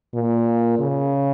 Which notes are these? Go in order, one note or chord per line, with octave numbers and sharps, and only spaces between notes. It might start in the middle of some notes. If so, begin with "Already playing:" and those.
A#2
C#3